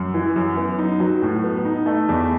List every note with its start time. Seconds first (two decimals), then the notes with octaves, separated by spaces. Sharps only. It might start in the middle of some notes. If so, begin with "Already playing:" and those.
Already playing: F#2
0.14 E3
0.36 F#2
0.57 B3
0.79 D#4
1.00 F#3
1.22 A2
1.44 B3
1.65 D#4
1.86 A3
2.09 E2